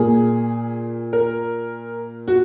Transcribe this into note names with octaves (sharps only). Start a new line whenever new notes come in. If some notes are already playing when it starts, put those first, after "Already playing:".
Already playing: A#2 A#3 G#4
A#4
F#4